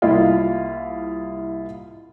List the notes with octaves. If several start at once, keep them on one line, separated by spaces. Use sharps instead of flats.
C2 A#3 E4 F4 D#5 F5